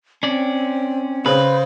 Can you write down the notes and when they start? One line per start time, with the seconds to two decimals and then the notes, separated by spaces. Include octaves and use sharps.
0.23 C4 C#4 D5
1.26 C#3 B4 C5